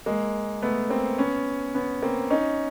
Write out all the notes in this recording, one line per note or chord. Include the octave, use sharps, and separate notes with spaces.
G#3 A#3
A3 B3
A#3 C4
B3 C#4
B3 C#4
A#3 C4
C#4 D#4